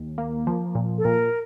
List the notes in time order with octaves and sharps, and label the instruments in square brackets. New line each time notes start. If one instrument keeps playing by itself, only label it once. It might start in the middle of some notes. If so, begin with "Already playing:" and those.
Already playing: [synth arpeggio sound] D#2
A#3
F3
A#2
[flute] A4
[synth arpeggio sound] A#2 [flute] A#4